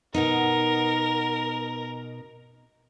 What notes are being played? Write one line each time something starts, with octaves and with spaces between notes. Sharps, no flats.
B2 B3 D#4 A#4